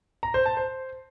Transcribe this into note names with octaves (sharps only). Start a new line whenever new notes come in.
A#5
C5
A5
C5